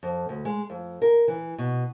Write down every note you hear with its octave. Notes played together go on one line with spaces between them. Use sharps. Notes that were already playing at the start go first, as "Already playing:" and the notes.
F2
D2
G#3
F2
A#4
E3
B2